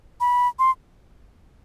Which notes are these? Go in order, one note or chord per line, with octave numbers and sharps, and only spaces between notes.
B5
C6